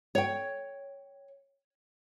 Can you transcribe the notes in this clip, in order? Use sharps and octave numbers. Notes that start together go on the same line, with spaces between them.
C#5 G5